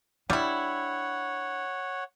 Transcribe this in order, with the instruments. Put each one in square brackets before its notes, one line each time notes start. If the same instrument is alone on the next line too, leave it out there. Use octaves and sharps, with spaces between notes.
[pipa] G3 E4 [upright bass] D4 [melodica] C#5 [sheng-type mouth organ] F#5